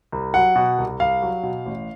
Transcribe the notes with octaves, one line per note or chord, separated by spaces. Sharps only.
C2
F#3 F#5
B2
C2
C2 F5
F#3
B2
A1